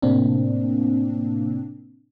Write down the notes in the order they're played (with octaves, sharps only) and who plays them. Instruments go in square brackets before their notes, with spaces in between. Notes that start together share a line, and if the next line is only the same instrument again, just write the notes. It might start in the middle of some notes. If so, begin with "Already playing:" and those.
[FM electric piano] A2 C3 A#3 C4 D4